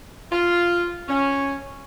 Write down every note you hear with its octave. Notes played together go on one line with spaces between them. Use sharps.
F4
C#4